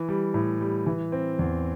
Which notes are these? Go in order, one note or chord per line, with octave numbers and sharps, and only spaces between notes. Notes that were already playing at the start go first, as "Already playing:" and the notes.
Already playing: E3
G3
A2
G3
E3
C4
E2